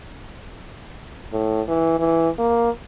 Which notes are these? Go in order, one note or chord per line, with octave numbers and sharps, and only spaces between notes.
A2
E3
E3
A#3